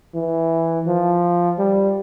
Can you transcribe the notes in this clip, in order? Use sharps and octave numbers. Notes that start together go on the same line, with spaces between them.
E3
F3
G3